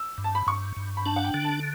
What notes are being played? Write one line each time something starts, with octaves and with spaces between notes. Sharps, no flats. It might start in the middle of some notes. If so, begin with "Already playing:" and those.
Already playing: E6
G2
A5
B5
G2 C#6
G2
B5
D4 A5
F#5
G5
D3
A5